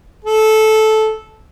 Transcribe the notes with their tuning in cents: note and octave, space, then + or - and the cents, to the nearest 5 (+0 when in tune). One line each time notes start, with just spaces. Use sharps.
A4 -15